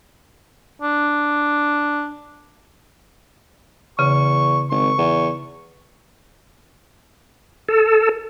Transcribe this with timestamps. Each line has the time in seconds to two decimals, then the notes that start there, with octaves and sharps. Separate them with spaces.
0.82 D4
3.99 E2 C#3 C#6
4.71 G#1 C#6
4.98 E2
7.69 A4